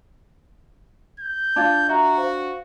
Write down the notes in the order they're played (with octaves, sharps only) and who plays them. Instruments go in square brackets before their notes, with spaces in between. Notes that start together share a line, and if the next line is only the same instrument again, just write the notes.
[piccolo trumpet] G6
[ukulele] D4 F4 [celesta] A5 G#6 A6
[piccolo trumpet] F#4 [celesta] E5 A#5
[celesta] C5 F5 F#5